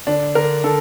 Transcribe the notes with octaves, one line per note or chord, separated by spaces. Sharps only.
D3 D4
D3 A#4
D3 A4